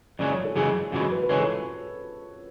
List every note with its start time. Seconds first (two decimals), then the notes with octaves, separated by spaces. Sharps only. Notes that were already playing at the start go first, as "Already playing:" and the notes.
0.19 F#2 C#3 E3 G#3 D5
0.31 C#5
0.44 A4
0.56 F#2 C#3 E3 G#3 G#4
0.92 F#2 C#3 E3 G#3 F#4
1.12 B4
1.23 B4
1.29 C#3 E3 G#3 C#5
1.39 A4